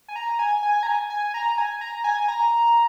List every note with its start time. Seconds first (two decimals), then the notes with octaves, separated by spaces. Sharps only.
0.08 G#5
0.16 A#5
0.39 G#5
0.63 G#5
0.83 A#5
0.87 G#5
1.10 G#5
1.34 A#5
1.58 G#5
1.81 A#5
2.04 G#5
2.28 A#5